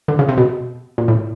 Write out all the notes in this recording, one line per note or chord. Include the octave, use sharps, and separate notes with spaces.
D3
C#3
C3
B2
A#2
A2